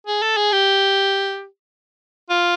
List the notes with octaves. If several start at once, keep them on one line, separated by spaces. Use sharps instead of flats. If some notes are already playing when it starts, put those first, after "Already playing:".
G#4
A4
G#4
G4
F4